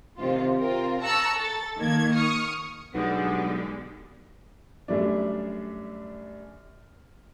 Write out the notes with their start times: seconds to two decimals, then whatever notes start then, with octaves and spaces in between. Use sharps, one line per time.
0.17 C3 D#3 F4
0.59 C4 F4 A#4
1.02 A5 A#5 C#6 E6 F#6
1.35 A4 A6
1.78 D#3 A#3 G#6
2.14 C#6 D#6 F6
2.94 B1 D3 G3 G#3 B3
4.88 F#2 G3 A3 D4